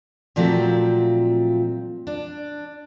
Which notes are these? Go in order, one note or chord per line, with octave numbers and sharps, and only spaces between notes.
A#2 F3 F#3 A3 C4
D4